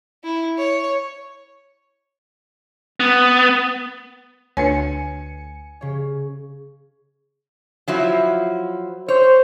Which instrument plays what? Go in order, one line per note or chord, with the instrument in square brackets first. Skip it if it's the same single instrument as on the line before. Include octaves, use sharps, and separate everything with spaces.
[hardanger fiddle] E4
C#5
[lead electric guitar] B3
[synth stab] D2 C#7 [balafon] D4 B4 C#5 [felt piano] G#5
[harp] C#3 C#5
[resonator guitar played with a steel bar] F3 F#3 E4
[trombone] C5 [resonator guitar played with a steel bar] C#5